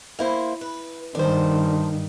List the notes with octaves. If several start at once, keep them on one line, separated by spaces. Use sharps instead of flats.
A#3 E4 C5
B4
G2 D#3 D4 C5